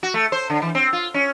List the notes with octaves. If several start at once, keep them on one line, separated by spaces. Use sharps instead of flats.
F#4
A3
C5
D3
E3
C4
F4
C#4